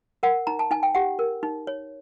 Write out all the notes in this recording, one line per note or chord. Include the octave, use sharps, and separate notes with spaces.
A#4 F#5
D#4 A#5
A5
D#4 G#5
G5
G4 F#5
A#4
D#4
C#5